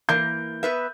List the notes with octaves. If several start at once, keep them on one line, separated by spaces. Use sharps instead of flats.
E3 A#3 G6
B3 B4 E5